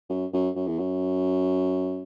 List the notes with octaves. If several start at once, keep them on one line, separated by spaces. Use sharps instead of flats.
F#2
F#2
F#2
E2
F#2